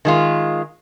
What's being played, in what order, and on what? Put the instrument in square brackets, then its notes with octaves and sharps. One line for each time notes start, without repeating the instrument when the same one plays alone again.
[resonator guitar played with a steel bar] D#3 G#3 F4